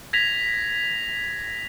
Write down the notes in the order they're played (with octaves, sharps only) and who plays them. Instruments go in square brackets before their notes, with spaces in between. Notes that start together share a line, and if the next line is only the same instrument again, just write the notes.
[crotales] G#6 A#6 B6 F7